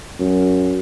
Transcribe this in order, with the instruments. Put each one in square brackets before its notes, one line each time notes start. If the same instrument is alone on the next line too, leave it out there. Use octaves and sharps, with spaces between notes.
[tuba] F#2